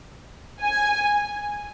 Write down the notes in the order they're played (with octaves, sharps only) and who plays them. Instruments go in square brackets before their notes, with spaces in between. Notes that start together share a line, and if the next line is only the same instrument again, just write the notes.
[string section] G#5